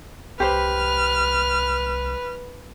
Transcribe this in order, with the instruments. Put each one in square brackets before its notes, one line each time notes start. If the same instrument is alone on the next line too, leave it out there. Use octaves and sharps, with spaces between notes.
[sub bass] C2 [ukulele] G4 C5 [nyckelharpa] B4 [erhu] F6